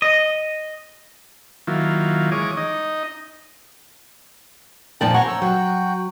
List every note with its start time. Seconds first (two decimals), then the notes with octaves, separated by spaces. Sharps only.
0.02 D#5
1.67 D#3 F#3 A#3 E4 F4
2.32 E3 G#3 C#5 D6 D#6
2.57 D#4 D#5
5.01 F2 A#2 F3 D#4 D5 G5 A5
5.14 C5 C#5 F#5 G#5 A#5 C#6
5.28 E6
5.42 F#3 F#4 G5